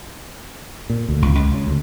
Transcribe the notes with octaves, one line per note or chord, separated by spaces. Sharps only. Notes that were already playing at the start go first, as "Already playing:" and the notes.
A#2
D2
C#2
C#2
C#3
D2